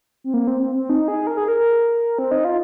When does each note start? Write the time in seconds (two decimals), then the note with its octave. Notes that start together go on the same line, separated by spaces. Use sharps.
0.24 C4
0.34 A#3
0.47 C4
0.61 C4
0.75 C4
0.89 D#4
1.08 G#4
1.27 A#4
1.37 G#4
1.48 A#4
2.19 C4
2.31 D#4
2.45 F4